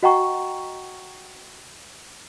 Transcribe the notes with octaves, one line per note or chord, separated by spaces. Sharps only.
F#4 D#5 F#5 G5 A#5 C#6